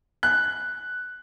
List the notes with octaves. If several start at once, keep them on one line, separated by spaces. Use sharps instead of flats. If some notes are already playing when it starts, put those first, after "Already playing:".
F#6